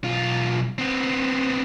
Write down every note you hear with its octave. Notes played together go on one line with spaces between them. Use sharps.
B1 F4
B3 C4